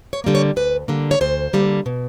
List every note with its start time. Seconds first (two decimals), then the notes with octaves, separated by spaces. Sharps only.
0.13 C#5
0.24 D3 G3 A#3
0.35 C#5
0.56 D2 B4
0.88 D3 G3 A#3
1.11 C#5
1.21 D2 C5
1.53 D3 G3 A#3
1.86 B2